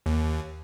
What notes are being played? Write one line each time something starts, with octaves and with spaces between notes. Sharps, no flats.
D#2